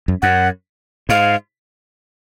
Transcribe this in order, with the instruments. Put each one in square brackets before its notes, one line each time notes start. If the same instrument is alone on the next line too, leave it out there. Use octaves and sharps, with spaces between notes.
[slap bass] F#2
[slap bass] F#2 [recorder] F#5
[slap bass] G#2 [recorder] F5